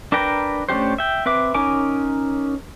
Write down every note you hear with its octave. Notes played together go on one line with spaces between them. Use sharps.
D4 A#4 B4 G5 A#5
A3 C#4 D4 G4 C5
E5 G5
C4 B4 E5 D6
C#4 D#4 A#4 G#5 D6